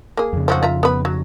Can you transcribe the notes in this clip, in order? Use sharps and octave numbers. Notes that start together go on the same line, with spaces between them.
A#3 G#4
F2 C#3
F3 F#3 F#4
F4 E5 A#5
B3 B4
F#3